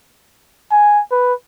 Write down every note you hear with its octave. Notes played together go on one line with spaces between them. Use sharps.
G#5
B4